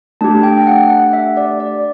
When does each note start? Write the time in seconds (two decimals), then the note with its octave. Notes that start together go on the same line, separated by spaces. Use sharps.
0.21 A3 D4 G4 A5
0.43 G5
0.67 F#5
0.89 F#5
1.13 E5
1.37 D5
1.60 D5